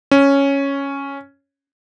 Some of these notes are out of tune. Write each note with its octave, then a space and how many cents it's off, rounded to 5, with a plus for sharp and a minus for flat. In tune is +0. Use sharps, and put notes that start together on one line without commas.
C#4 +0